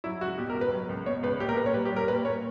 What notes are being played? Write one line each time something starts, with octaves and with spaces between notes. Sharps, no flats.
F#3 E4
C#2 F#4
B2 G4
A#4
C#2
B4
F#3
C#2
B2 C#5
C#2 B4
A#2 G4
A#4
A#2 B4
C#5
G3 B4
G4
G3
A#4
A#2 B4
A#2 C#5